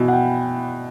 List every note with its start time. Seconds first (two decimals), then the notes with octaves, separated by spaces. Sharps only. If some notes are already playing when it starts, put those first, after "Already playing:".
Already playing: B2 E4 G#5 B5
0.08 F#5
0.13 G5